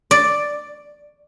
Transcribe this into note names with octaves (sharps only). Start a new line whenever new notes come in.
D5